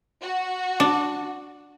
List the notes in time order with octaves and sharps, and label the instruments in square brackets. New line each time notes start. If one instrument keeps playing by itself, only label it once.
[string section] F#4
[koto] D4